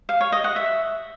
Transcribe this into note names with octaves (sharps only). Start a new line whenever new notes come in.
F5
C#5
D#5
F#5
E5